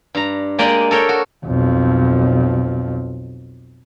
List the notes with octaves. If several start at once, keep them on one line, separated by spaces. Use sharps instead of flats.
G2 A#5
G#3 A#3 G4 D5 D#5
A4 A#4 C#5 G5
F#4
B1 F2